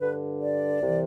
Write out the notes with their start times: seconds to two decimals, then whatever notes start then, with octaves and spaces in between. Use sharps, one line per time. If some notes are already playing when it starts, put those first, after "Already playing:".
0.01 G2 D3 B4
0.42 D5
0.81 C2 C3 E3